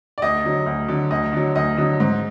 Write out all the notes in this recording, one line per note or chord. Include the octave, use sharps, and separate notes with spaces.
D5
D2 D#5
D3 F#3
D2
D3 F#3
D2 D#5
D3 F#3
D2 D#5
D3 F#3 D#5
G#2